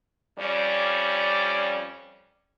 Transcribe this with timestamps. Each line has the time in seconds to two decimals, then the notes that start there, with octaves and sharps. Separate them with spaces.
0.38 F2 G3 C#4 D5